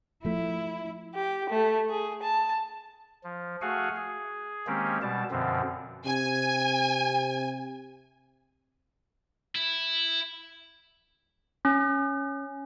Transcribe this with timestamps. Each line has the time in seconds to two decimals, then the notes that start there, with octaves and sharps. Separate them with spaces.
0.25 F3 A3 E4
1.14 G4
1.50 A3
1.89 G#4
2.23 A5
3.24 F3
3.62 A3 F#4 G#4 F5 F#5 G#5
3.96 G#4
4.67 D#3 G#3 A#3 C4 C#4 G4
5.02 B2 G3 A5
5.31 F#2 B2 D3 F3 C4
6.06 C3 G#5
9.55 E4
11.65 C#4